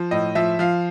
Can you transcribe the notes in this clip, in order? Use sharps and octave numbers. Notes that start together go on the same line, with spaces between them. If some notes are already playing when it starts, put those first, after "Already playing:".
Already playing: F3
A2 D#5
F3 E5
F3 F5